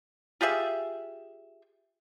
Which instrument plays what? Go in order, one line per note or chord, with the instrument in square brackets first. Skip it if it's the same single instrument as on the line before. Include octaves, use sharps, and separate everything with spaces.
[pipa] F4 G4 G#4 E5